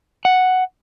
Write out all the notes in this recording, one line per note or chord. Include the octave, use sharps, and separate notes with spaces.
F#5